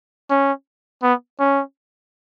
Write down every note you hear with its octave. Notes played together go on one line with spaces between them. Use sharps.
C#4
B3
C#4